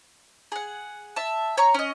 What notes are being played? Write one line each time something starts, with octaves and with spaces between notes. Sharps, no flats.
G#4 F#5
E5 A5
C#5 A#5 C#6
C#4 D#5